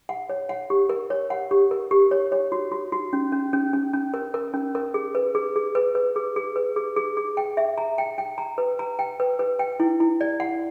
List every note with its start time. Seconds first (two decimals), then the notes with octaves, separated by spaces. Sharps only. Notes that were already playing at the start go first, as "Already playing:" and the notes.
0.09 F#5
0.29 C#5
0.49 F#5
0.70 G4
0.89 A#4
1.10 C#5
1.30 F#5
1.51 G4
1.71 A#4
1.91 G4
2.11 C#5
2.32 C#5
2.52 F#4
2.72 F#4
2.92 F#4
3.13 C#4
3.32 C#4
3.53 C#4
3.73 C#4
3.93 C#4
4.14 A#4
4.34 A#4
4.54 C#4
4.75 A#4
4.94 G#4
5.15 B4
5.35 G#4
5.56 G#4
5.75 B4
5.95 B4
6.16 G#4
6.36 G#4
6.56 B4
6.76 G#4
6.96 G#4
7.17 G#4
7.37 G5
7.57 E5
7.78 A#5
7.98 G5
8.18 G5
8.38 A#5
8.58 B4
8.79 A#5
8.99 G5
9.20 B4
9.39 B4
9.59 G5
9.80 E4
10.00 E4
10.21 D5
10.40 F#5